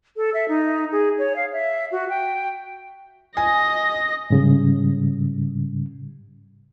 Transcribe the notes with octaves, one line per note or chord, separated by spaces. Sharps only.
A4
E5
D#4
G#4
C#5
F5
E5
F#4
G5
D#5 G#5 A#6
G#2 C#3 G3